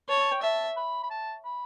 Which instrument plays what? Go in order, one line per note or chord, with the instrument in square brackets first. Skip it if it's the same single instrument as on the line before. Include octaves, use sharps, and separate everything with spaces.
[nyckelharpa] C#5 [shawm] A5
[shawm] A5
G5
[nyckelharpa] E5 [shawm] A5
[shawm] B5
B5
A5
B5